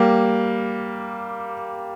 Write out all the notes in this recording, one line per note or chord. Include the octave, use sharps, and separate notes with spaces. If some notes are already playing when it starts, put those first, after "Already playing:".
Already playing: G3 A#3